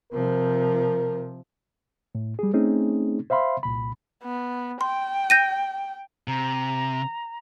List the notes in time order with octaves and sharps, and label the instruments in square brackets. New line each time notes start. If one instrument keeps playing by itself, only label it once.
[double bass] C3 F3 [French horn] A#4
[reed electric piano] A2
G3 G#4
A3 C4 C#4 D#4 G#4
C5 E5 F5 B5 C6
C2 A#2 B5
[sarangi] B3
[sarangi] G5 [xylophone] C6
[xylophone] G6 A#6 D#7
[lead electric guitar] C3 [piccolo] A#5